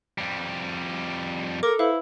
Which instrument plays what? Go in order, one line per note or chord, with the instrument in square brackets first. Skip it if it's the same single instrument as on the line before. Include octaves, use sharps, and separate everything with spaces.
[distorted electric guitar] F2 G3
[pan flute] A4 [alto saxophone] A#4 [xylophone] D6
[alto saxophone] E4 [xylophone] B4 C5 F5